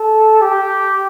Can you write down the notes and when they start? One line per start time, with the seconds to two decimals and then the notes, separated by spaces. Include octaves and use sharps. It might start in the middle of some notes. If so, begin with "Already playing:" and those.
Already playing: A4
0.41 G4